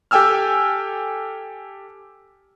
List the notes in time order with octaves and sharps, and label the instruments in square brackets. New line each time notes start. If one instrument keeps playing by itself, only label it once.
[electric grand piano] G4 A4 G5 G#5 E6 F6